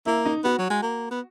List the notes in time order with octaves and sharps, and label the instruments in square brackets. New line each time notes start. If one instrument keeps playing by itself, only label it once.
[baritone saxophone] A#3 [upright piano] E4
[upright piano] D#4
[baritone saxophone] B3 [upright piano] F#4
[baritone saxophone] F#3
G#3
A#3
B3